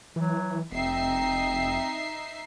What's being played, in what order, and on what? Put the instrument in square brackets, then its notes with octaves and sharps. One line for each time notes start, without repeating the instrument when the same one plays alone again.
[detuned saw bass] E3 [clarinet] F#3
[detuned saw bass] F1 [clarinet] C4 [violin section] D#4 E5 C7